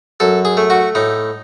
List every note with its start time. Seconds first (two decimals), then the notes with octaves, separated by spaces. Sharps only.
0.20 F#2 A4
0.45 G#4
0.57 A3
0.70 F#4
0.95 A2 D#4